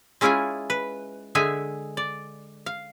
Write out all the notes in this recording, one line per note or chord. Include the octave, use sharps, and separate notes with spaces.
G#3 C#4 E4 F4 G#4 G#5
B4
D3 G#3 G#4 E5 G#5
D5
F5